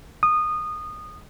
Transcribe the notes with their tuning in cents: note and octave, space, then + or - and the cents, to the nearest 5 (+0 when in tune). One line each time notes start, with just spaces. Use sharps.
D#6 -20